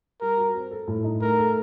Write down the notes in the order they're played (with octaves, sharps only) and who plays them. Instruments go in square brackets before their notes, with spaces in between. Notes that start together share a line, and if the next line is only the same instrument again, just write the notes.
[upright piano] G3 [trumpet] A#4
[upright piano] F#4
C4
A4
A2
D#4
[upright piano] A3 [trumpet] A#4
[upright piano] A4